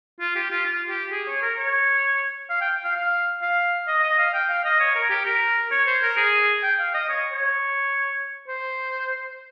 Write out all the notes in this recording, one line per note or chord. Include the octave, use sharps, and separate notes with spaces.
F4
G4
F4
F4
G4
G#4
C#5
A#4
C#5
F5
G5
F5
F5
F5
D#5
D#5
F5
G5
F5
D#5
C#5
A#4
G4
A#4
C#5
C5
A#4
G#4
G5
F5
D#5
C#5
C#5
C5